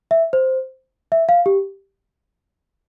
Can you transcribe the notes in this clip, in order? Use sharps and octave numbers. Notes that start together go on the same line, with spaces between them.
E5
C5
E5
F5
G4